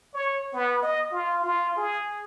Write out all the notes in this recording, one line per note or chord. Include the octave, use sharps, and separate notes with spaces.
C#5
B3
D#5
F4
F4
G#4